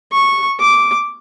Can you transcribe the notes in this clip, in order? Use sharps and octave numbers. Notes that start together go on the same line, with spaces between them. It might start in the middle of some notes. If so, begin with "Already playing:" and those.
C#6
D6